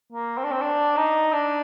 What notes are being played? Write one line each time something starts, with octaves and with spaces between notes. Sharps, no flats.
A#3
C4
D4
C4
D4
D#4
D4